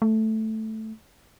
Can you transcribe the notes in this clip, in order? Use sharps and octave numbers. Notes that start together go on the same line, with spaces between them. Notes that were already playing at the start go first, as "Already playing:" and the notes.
A3